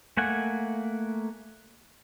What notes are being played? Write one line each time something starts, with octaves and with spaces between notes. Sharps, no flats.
A3 A#3 F#5 G#5